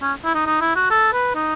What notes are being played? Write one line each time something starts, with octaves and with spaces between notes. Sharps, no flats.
C#4
E4
D#4
D#4
E4
F#4
A4
B4
D#4